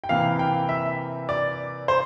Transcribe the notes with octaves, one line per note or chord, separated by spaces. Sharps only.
G5
C3 E3 A#3 F5
G5
E5
D5
C5